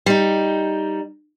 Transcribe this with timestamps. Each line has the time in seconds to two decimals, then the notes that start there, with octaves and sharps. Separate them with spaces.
0.06 G3 D#4